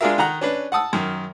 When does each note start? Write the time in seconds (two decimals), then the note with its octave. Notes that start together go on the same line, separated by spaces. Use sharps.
0.01 G#3 D4 F4 G#4 A#4 E5
0.18 D#3 F#5 A#5 F#6
0.41 C#4 D4 B4
0.72 F#5 A5 D#6 E6
0.93 F#2 D#3